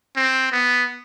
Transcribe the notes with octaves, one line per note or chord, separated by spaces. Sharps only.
C4
B3